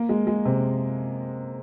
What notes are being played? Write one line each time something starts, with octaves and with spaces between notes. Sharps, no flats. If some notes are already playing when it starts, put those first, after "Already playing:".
Already playing: A#3
G#3
G#3
C3